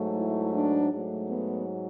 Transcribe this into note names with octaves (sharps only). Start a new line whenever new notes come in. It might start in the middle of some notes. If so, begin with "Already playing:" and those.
Already playing: G#2 F#3 A3
E4
D4
G#2 F#3 A3
B3